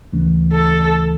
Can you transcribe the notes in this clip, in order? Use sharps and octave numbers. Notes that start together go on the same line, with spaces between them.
D2 C#3 E3 A3 C#4
A4